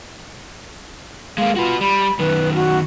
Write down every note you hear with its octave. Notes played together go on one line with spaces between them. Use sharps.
G#3 A#3 F5
F4 F#4 B4
G3 B5
F#2 D#3 B4
F#4